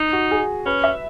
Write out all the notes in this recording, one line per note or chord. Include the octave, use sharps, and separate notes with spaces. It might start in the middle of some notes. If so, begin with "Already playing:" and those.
Already playing: D#4
F#4
G#4
C#4 B4
E5